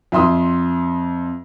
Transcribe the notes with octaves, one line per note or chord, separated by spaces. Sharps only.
F2 E5 C6 D#6